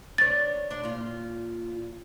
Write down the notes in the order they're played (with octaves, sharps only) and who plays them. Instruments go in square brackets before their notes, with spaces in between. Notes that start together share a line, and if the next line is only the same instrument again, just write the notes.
[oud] D4 C#5 [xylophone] A6
[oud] D4
A#2 F4